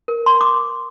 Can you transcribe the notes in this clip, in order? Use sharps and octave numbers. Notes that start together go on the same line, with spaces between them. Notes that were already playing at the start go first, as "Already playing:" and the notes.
A#4
A#4 C6
D6